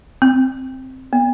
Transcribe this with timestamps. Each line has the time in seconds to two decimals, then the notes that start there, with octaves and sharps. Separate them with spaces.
0.22 C4
1.13 B3